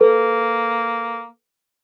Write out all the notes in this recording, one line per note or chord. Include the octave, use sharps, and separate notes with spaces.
A#3 A4 B4